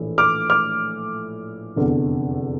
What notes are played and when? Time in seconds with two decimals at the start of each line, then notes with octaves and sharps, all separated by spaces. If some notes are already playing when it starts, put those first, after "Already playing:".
Already playing: A#1 A2 E3
0.18 D6 F6
0.50 D6 F6
1.76 F1 E2 D3